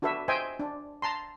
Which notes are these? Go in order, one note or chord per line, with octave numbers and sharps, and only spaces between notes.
D4 F#4 A4 B4 E5
C5 D#5 E5 G5 G#5 C6
D4
A5 A#5 C6